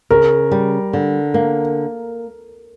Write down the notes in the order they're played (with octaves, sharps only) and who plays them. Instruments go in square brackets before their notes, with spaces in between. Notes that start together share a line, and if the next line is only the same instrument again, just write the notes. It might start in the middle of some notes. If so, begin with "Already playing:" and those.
[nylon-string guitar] C#3 [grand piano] A#4
[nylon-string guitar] G3
D3
A#3